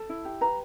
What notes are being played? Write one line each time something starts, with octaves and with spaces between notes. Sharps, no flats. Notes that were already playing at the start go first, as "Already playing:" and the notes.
Already playing: A4 A5
E4
G4
B4 A#5